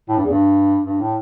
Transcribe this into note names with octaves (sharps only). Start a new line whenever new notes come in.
A2
G2
E2
G2
G2
A2